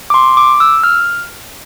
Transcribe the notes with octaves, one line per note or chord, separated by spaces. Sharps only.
D6
C6
D6
E6
F6